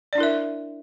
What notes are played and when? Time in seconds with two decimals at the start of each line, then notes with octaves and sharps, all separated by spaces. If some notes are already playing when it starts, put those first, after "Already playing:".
0.13 D5
0.15 D4
0.18 E4
0.20 A#4
0.23 E5